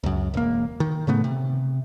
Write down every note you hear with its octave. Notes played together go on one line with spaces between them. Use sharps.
C#2 F#2
E1 A#3
D#3
A2 C#3 A3 B3
C3